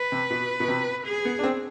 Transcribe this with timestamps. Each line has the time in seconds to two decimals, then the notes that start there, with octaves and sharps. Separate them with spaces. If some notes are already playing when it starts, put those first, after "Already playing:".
Already playing: B4
0.12 C3
0.30 B2
0.60 B2
0.68 C3
1.06 G#4
1.25 B3
1.39 D4
1.43 C4